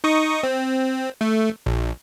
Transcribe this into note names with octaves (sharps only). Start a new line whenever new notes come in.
D#4 C#6 D#6
C4
A3
A#1